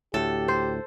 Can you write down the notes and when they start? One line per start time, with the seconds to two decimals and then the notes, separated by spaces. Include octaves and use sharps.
0.14 D2 A2 G4 A4
0.48 C5